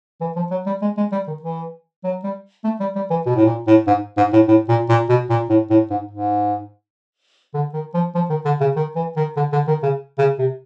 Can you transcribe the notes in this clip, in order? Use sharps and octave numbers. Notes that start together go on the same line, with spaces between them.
E3
F3
F#3
G3
G#3
G#3
G3
D#3
E3
F#3
G3
A3
G3
G3
E3
B2
A2
A#2
A2
G#2
G#2
A2
A2
A#2
A#2
B2
A#2
A2
A2
G#2
G#2
D3
D#3
F3
F3
D#3
D3
C#3
D#3
E3
D#3
D3
D3
D#3
C#3
C#3
C3